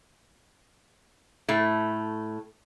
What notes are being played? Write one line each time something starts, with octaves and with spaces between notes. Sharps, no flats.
A2 A3